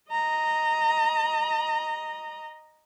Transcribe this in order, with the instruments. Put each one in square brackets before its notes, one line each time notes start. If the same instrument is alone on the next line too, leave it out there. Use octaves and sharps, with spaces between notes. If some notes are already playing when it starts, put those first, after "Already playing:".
[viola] D#5 A#5